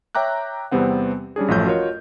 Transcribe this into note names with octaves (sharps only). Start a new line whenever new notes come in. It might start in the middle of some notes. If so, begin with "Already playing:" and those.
C#5 E5 G5 A#5 D6 F#6
E2 C3 G3 B3 C4 F#5
G3 C#4 D4 G#4
A1 F#2 F3 A3 G6
F4 F#4 A#4 C#5 D#5